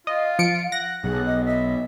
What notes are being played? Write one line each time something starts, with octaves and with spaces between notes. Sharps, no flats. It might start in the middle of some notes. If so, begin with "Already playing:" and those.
F4 D#5 F5
F3 C#7 D7
F#5 A#6
B1 G#4 F#5
D#5
D#5 E5